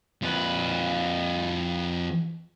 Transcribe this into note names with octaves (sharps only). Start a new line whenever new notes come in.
F2 B4